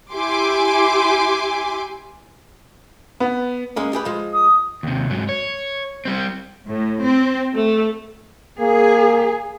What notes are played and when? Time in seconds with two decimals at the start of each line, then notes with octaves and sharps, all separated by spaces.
0.14 E4 G4 G#5 C6 D6
3.20 B3
3.76 G#3 A#3 C#4
3.93 G4 G#4 B4
4.05 F3 G#3
4.33 D#6
4.83 D#2 C3
5.10 G#2 F#3
5.29 C#5
6.05 G3 C4
6.66 A2
7.05 C4
7.55 A3
8.60 A#3 G#4